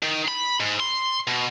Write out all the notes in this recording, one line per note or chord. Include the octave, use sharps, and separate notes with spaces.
D#3
B5
G#2
C6
B2